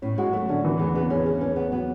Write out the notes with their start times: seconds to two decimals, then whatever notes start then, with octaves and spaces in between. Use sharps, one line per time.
0.02 A2 C#4
0.18 G#3 F#4
0.33 F#3 A3
0.49 D3 C#4
0.65 E3
0.79 E2 B3
0.95 C#3 B3
1.10 E2 C#4
1.25 C#4 G#4
1.41 C#4 B4
1.56 B3 C#4
1.71 F#3 B3